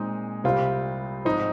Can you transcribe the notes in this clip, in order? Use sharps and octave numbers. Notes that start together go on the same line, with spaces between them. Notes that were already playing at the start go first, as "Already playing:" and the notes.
Already playing: A#2 G#3 C4 D#4
C2 C3 G3 C4 F4
G#2 F3 C4 D#4